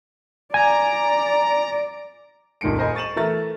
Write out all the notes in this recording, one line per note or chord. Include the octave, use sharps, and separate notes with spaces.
D5 G#5 A#5
D#1 A#2 D#3 G#3 C#7 D7
A#4 C5 D#5 G#5 B5
C#6 A6 D#7 E7 F#7
E3 A3 A#4 A6